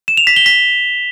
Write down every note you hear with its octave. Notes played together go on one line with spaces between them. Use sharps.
E7
F7
B6
G7
B6